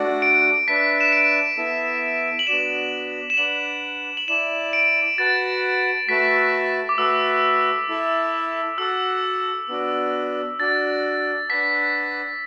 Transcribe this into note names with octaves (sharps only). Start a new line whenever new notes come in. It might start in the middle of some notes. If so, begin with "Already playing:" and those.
Already playing: A3 D4 F#4 D5 F#5
D7
D4 B4 E5 A5 B6
E7
D7
B3 E4 A4 E5 A5
F#7
B3 D4 F#4 D5 E7
E7
D4 B4 D5 F#5 F#7
F#7
E4 D5 A5 E7
D7
F#4 B4 F#5 A5 A6
A3 F#4 B4 E5 A5 B6
D6
A3 F#4 B4 E5 E6
E4 A4 E5 A5
F#4 A4 F#5 A5 E6
B3 D4 F#4 D5
D4 F#4 D5 A6
D4 B4 F#5 A5 B6